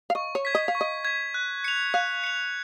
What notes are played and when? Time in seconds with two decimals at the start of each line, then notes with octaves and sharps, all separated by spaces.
0.10 F5
0.15 D#5 C#6
0.35 C#5
0.45 G#6 B6
0.55 D#5
0.68 F5
0.75 C#6
0.81 D#5
1.05 G#6 B6
1.34 F#6
1.64 C#7 F7
1.94 F5 F#6
2.24 C#7 F7